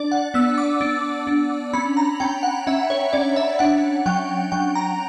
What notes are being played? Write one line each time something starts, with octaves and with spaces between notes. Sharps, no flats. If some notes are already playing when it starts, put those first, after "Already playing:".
Already playing: D4 D5
F#5
B3 E6
D6
D4
D4
C#4 B5
A#5
C#4 G5
F#5
C#4 E5
C#5
C#4 D5
E5
D4 F#5
F#3 G5
F#3 G5
A#5